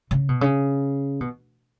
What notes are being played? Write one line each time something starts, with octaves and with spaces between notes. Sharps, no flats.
C#3
B2
C#3
B2